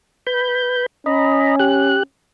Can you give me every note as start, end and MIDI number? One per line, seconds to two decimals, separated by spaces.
0.27 0.86 71
0.27 0.86 83
0.27 0.86 91
1.06 1.99 61
1.06 1.56 75
1.06 1.56 82
1.06 1.56 83
1.59 2.03 67
1.59 2.03 90